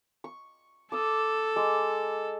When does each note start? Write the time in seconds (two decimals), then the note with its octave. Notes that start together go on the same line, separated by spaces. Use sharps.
0.24 C#6
0.92 A4 D6 D#6
1.56 G#3 D6